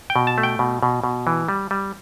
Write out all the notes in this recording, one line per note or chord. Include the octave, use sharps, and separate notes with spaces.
G5
B2
A5
A3
G5
B2
B2
B2
E3
G3
G3